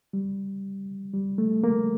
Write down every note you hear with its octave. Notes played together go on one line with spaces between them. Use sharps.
G3
G3
A3
A#3